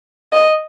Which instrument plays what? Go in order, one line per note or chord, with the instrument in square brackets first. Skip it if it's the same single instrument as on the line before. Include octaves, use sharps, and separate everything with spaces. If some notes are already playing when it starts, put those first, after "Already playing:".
[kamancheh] D#5